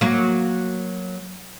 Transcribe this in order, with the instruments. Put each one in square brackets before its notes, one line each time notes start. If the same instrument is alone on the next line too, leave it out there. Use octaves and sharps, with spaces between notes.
[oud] F#3 A#3